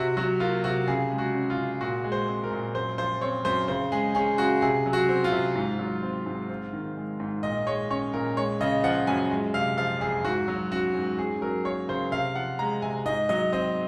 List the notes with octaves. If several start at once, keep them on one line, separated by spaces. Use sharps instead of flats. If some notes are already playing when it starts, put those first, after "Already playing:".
Already playing: C3 F#4
F#3 F#4
A#3 F4
C3 F#4
C#3 G#4
G#3
F#4
C#4
F4
C#3
A#2 F#4
G#3
C5
C4
A#4
A#2
F#2 C5
F3 C5
C4 C#5
F#2 C5
C#3 C5
G#3 G#4
C#4 G#4
C#3 F#4
C3 G#4
F#3
F#4
C4
F4
C3
G#2
F#3
C4
G#2
C4
D#3
G#3
G#2
A#2 D#5
G#3 C#5
C#4 C#5
A#2 A#4
G#3 C#5
C#3 D#5
F3 F#5
F#2 G#5
G#3
C3 F5
F3 F5
F2 G#4
G#2 F#4
F#3
C#4 F#4
G#2
C#4 G#4
F#3 A#4
A#3 C#5
C#3 C5
C3 F5
F3 F#5
G#3 A#5
C3 G#5
G#2 D#5
F#3 D#5
C4 D#5